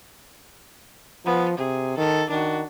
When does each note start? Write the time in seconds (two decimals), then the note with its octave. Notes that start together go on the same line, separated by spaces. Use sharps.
1.26 F3 B3
1.58 C3 G#4
1.98 D#3 A4
2.30 D#3 D4 F#4